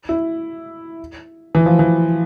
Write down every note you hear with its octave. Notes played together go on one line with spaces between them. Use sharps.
E4
E3
F3
E3